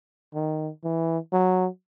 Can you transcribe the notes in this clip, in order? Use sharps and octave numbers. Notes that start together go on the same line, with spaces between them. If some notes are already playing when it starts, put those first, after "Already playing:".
D#3
E3
F#3